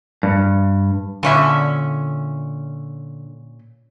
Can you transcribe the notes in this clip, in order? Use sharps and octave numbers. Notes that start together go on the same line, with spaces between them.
G2
A#2 D3 C#4 E5